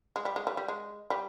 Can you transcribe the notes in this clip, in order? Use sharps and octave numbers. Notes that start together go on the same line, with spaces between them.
G#3
G3
G#3
G3
G3
G#3
G3